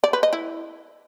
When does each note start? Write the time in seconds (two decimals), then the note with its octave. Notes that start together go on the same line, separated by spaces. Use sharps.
0.04 D5
0.13 B4
0.23 D#5
0.33 E4